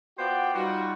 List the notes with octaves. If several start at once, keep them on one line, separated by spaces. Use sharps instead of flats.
B3 F4 F#4 C5 D5 G5
G3 D#4 F4 F#4